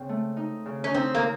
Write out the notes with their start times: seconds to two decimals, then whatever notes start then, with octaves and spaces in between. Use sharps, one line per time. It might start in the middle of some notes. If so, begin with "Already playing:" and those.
Already playing: C#3 C4
0.09 A3
0.37 D#4
0.65 C#3
0.84 C#4
0.94 C4 D#4
1.15 A#3